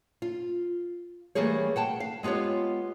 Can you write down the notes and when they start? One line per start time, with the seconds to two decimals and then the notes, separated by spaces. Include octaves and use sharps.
0.22 F4
1.35 E3 G3 A3 A#3 G#4 C#5
1.76 F#5 G5 A5
2.00 F5
2.23 G#3 B3 F4 G4 C#5